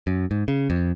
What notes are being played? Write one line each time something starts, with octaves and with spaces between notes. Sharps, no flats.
F#2
G#2
C#3
F2